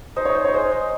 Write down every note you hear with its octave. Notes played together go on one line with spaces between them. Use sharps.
D#4 C5
C#5
D#4 C5
C#5
G#3 C5
D#4